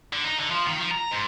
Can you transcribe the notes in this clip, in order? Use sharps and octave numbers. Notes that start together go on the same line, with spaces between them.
D3
D#4
D3
F3
D#3
F3
A#5
G#2